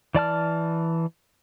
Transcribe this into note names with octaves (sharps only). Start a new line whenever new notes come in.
E3 D5 A5 F6